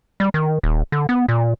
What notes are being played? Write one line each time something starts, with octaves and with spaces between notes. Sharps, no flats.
G3
D#3
D#1
D3
B3
A#2